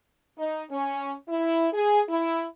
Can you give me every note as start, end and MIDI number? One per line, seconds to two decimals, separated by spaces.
0.38 0.64 63
0.70 1.13 61
1.29 1.68 64
1.73 2.01 68
2.09 2.44 64